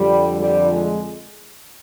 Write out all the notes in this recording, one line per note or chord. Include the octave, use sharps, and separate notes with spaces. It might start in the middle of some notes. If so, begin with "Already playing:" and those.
Already playing: F2 D3 G3
G3
G#3